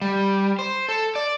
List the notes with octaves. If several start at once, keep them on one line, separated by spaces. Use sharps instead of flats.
G3
C5
A4
D5